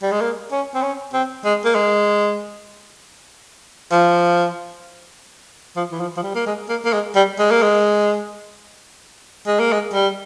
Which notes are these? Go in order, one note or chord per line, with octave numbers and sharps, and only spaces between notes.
G3
G#3
A#3
C#4
C4
C#4
C4
G#3
A#3
G#3
F3
F3
E3
F3
F3
G3
A#3
G#3
A#3
A#3
G#3
G3
G#3
A#3
G#3
G#3
A#3
G#3
G3